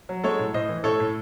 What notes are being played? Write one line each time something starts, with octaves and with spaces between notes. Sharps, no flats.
F#3
G#3 A4 C#5
A2
A2 C5 D#5
E3
A2 A4 C#5
A2